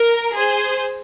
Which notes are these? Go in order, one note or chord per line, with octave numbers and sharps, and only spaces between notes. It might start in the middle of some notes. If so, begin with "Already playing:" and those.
Already playing: A#4
G#4 C5